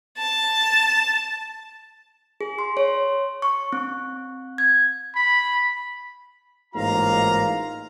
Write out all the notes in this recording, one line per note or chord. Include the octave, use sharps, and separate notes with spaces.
A5
G#4
C6
C#5
C#6
C4
G#6
B5
A1 G#2 A#3 F4 F5 A#5